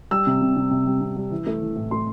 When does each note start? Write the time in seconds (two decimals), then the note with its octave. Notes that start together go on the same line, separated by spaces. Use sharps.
0.11 G3 E6
0.27 C3
0.42 C3
0.57 C3
0.71 C3
0.87 G3
1.01 C3
1.17 G3
1.32 E3
1.47 A3
1.62 E3
1.76 A2
1.91 A3 C6